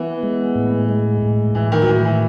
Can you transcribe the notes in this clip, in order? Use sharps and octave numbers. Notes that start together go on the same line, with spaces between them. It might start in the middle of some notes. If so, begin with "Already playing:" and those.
Already playing: E3 B3
G#3
A2
G#3
A2
A2 E3
D#3
F#3
A2 E3
E3